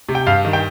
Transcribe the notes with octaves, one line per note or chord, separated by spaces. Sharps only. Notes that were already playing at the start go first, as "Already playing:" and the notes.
C3
G5
G2 F5
D#3
G5